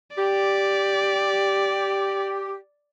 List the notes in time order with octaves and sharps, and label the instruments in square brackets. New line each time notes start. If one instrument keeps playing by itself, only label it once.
[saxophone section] G4 [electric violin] D5